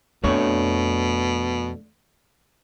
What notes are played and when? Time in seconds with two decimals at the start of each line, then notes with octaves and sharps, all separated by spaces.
0.24 F2 B2 A3 D4 C#5